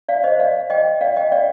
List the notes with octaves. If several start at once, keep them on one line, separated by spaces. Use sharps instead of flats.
D5 F5
C5 D#5
D5 F5
D#5 G5
D5 F5
D#5 G5
D5 F5